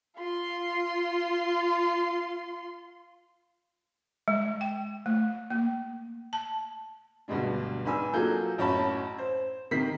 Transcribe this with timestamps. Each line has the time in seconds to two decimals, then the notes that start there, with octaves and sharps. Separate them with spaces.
0.17 F4 C6
4.28 G#3
4.61 G5
5.06 A3
5.50 A#3
6.33 A5
7.28 D2 G2 B2 G3 G#3 D4
7.85 G#2 D4 B4 G#5 E6
8.13 F#3 A#3 F4 G#4 A4 G6
8.58 A1 F#2 C#5 A5 B5
9.18 C5
9.71 C3 D#3 A#4 B6 C7